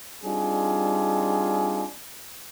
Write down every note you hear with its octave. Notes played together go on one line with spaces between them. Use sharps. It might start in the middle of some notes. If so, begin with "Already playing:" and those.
G3 C4 D4 D#4 F4 G#4